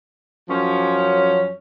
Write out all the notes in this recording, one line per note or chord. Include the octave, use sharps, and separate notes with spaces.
F#2 F3 C#4